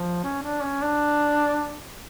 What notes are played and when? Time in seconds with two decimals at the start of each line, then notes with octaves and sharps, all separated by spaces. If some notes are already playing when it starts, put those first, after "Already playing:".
Already playing: F3
0.24 C#4
0.43 D4
0.63 C#4
0.83 D4